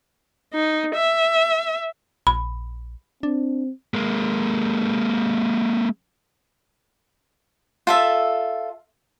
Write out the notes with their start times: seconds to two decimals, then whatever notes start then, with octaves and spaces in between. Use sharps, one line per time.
0.54 D#4
0.95 E5
2.27 A#1 B5
3.23 C4 D4
3.94 G#3 A#3
7.87 F4 A4 E5